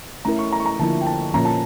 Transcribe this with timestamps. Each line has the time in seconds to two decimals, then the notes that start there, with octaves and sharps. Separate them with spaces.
0.25 A3 C#4 E4 A#4 A#5
0.39 C#6
0.52 A#5
0.60 C#6
0.66 A#5
0.79 D3 F3 A#3 E4 A5
1.01 G5
1.07 A5
1.34 A#2 F3 A#3 C#4 A#5
1.45 A5